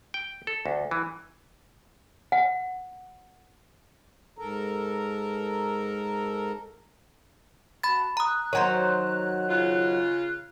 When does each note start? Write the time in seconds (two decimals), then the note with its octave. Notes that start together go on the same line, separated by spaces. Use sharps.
0.14 G5
0.47 A4
0.66 D2
0.91 E3
2.32 F#5
4.38 G#2 A4 A#4 A#5
7.83 F#4 A5 B5 A6
8.17 A#5 D#6 F#6
8.53 D#3 F#3 C5 C#5 A#5
9.50 C#3 F4